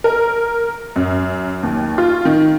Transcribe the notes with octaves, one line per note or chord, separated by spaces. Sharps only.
A#4
F#2
D#2
F4
D#3